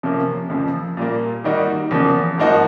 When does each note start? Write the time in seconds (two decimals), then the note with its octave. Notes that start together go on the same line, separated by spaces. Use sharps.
0.03 C3 F3 A#3 C#4
0.50 F2 C#3 F3
0.97 A#2 G3 A#3
1.44 D#3 G3 A#3 D#4 F#4
1.91 E2 C#3 F3 A#3
2.38 G#2 F3 A#3 D#4 F#4